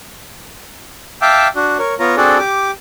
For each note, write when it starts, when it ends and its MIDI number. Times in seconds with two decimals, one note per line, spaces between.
1.22 1.48 76
1.22 1.48 77
1.22 1.48 79
1.22 1.48 81
1.22 1.48 86
1.22 1.48 88
1.56 1.78 62
1.56 1.78 66
1.79 1.95 70
1.79 1.95 73
1.99 2.15 59
1.99 2.15 65
1.99 2.15 73
1.99 2.15 82
2.17 2.38 60
2.17 2.38 62
2.17 2.38 66
2.17 2.38 68
2.17 2.38 69
2.17 2.38 74
2.39 2.71 67
2.39 2.71 86